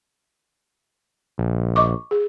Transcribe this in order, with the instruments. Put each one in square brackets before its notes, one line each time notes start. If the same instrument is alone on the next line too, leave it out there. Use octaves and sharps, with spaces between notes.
[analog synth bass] A#1
[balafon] D#5 C#6 D6
G#4